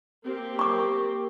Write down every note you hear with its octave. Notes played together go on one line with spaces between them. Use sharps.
A#3 C4 G4
C#6 D6